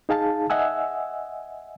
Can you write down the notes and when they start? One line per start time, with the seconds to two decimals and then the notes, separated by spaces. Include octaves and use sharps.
0.09 D#4 G#4 F5 A5
0.50 D#5 E5 F#5 G#5 E6